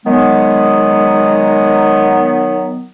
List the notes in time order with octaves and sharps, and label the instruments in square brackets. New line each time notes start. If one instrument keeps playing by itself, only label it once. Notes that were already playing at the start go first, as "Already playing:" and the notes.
[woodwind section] D#3 F#3 B3 [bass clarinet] G#3